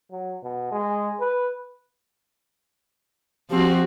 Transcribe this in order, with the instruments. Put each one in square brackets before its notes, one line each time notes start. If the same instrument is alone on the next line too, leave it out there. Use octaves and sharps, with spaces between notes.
[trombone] F#3
B2
G#3
B4
[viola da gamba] F3 C4 F#4 [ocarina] G4